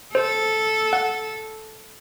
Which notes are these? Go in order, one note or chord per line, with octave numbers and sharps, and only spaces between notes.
A4 C5
F#5